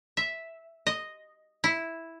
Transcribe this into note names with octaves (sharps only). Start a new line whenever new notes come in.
E5
D#5
E4